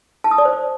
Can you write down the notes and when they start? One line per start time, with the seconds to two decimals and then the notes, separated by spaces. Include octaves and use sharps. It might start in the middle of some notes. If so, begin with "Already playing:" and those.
0.24 A5
0.31 D#6
0.38 D5
0.45 C5